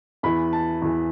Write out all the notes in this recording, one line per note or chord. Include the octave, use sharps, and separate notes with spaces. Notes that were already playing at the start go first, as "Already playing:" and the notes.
E2 E3 B5
A5
E2 E3